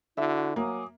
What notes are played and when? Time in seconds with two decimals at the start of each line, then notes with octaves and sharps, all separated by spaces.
0.17 D3 E4 F#4 E5
0.56 F#3 A#3 G#5 D6 D#6